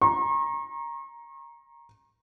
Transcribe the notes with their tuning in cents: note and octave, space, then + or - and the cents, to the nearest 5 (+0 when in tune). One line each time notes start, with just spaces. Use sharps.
A#5 +10 C#6 -45